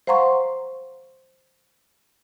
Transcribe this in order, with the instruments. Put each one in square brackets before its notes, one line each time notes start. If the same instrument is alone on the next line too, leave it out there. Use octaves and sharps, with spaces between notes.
[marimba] C5 F5 F#5 A#5 C6 C#6